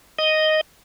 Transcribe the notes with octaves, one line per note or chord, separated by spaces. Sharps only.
D#5